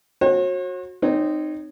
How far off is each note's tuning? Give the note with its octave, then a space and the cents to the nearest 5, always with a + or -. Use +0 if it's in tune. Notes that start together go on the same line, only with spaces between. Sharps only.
F#4 -15 C#5 -45
C4 -10 D#4 -20 C#5 +10